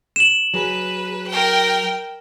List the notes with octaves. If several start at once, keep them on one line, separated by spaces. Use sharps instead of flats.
E7 F#7
F#3 G#4 B4
A#4 G5